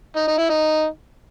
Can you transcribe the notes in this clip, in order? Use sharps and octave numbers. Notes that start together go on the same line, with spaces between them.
D#4
D#4
E4
D#4